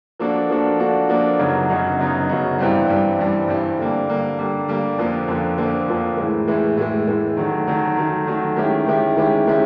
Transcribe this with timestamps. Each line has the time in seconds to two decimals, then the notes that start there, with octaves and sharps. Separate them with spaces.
0.19 F3 A#3 D4 F#4 A4
0.50 F3 A#3 D4 F#4 A4
0.79 F3 A#3 D4 F#4 A4
1.09 F3 A#3 D4 F#4 A4
1.39 F#2 C#3 F#3 B3 D#4
1.69 F#2 C#3 F#3 B3 D#4
1.99 F#2 C#3 F#3 B3 D#4
2.29 F#2 C#3 F#3 B3 D#4
2.58 G2 E3 G3 C4
2.89 G2 E3 G3 C4
3.19 G2 E3 G3 C4
3.48 G2 E3 G3 C4
3.78 D3 G3 A#3
4.08 D3 G3 A#3
4.38 D3 G3 A#3
4.68 D3 G3 A#3
4.98 F2 D3 F3 A#3
5.28 F2 D3 F3 A#3
5.58 F2 D3 F3 A#3
5.88 F2 D3 F3 A#3
6.17 A2 E3 G#3
6.48 A2 E3 G#3
6.77 A2 E3 G#3
7.07 A2 E3 G#3
7.37 D#3 F#3 A3
7.67 D#3 F#3 A3
7.97 D#3 F#3 A3
8.27 D#3 F#3 A3
8.56 D#3 G#3 C#4 E4 G4
8.87 D#3 G#3 C#4 E4 G4
9.16 D#3 G#3 C#4 E4 G4
9.47 D#3 G#3 C#4 E4 G4